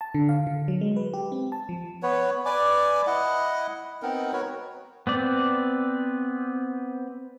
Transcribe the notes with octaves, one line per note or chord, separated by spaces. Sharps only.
A5
D3
F5
D3
F#3
G#3
B4
G4
C4
A5
F3
B3 B4 C#5
B4 D5 G#5 D6
E4 D#5 F#5
B3 C4 D#4 A#4
F#4 A#4 B4 C#5
B3 C4 D5